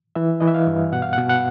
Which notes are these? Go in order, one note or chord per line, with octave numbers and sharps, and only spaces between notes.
E3 E5
E3 D#5
E5
F5
G2
B2 F#5
F5
B2 F#5
F#5